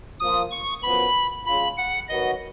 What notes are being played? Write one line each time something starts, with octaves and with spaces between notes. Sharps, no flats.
F3 A#3 F4 D#6
C#6
F#2 F3 B3 B5
C#3 G#3 C#4 F4 B5
F#5
D#3 F#3 B3 F#4 D#5